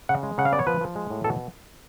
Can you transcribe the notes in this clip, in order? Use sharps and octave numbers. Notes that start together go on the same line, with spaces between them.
C#3 F#5
G#3
C#3 F#5
F5
B3 D5
C#5
F3 B4
F3
G#3
A2
B2 A4